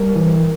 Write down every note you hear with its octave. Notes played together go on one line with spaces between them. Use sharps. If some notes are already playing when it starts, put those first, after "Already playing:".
Already playing: G3 A#4
E3